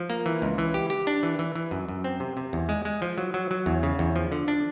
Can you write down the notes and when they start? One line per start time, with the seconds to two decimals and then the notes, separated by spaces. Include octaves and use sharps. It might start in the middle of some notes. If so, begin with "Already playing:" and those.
Already playing: F3
0.10 A#3
0.26 E3
0.42 C#2
0.58 E3
0.74 G4
0.90 G4
1.07 D4
1.23 E3
1.39 E3
1.56 E3
1.71 F#2
1.88 F#2
2.04 C4
2.20 C3
2.37 C3
2.53 E2
2.69 G#3
2.85 G#3
3.02 F3
3.18 F#3
3.34 F#3
3.51 F#3
3.66 E2
3.83 C#3
3.99 E2
4.16 F3
4.32 D3
4.48 D4